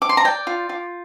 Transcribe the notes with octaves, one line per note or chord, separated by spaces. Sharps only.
D6
C6
A#5
D5 G5
F4
F4